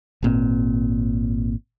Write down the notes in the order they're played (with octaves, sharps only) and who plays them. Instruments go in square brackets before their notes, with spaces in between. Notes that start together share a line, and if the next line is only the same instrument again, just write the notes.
[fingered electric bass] G#1 A#2 C4